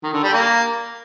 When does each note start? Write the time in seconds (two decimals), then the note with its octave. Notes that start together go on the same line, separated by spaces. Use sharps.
0.03 D#3
0.13 D3
0.23 G3
0.33 A#3